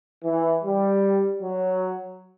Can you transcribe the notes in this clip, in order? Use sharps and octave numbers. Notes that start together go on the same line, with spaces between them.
E3
G3
F#3